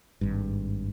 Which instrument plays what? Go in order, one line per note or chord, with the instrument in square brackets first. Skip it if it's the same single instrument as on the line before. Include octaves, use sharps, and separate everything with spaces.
[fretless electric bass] G#1 G2